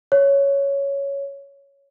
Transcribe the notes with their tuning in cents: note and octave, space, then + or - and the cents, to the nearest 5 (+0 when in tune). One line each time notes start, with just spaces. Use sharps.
C#5 +5